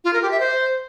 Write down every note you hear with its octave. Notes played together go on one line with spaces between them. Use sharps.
F4
A#4
G4
E5
C5